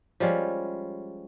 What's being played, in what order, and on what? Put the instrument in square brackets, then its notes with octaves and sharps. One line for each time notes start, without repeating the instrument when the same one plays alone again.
[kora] F3 G3 G#3 C#4